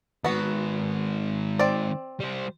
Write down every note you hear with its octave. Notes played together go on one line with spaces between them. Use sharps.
D#3 G#3 B3 F#4
C4 D5
G3 C5